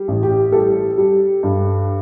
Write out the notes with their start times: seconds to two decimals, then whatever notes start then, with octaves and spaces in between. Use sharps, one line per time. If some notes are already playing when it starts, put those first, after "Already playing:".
Already playing: G3
0.08 A1
0.23 G4
0.52 G3 A4
0.98 G3
1.43 G2